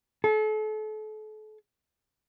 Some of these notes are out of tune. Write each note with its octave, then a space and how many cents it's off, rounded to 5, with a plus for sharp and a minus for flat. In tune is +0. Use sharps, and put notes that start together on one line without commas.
A4 -35